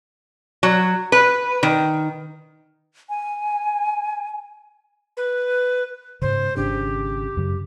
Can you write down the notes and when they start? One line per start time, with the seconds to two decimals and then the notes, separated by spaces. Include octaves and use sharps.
0.63 F#3
1.12 B4
1.63 D#3
3.09 G#5
5.17 B4
6.22 G#2 C#3 C5
6.57 G#1 C#3 D4 G4
7.37 F#2 C#3